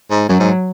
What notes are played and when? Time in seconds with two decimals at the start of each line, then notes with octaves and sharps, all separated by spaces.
0.11 G#2
0.29 F#2 F#3
0.40 G#2